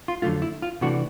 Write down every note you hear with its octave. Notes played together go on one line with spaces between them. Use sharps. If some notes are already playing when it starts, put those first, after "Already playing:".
F4
F2 D3 F#3 A3 F4
E4
F4
C3 E3 A3 D4 F#4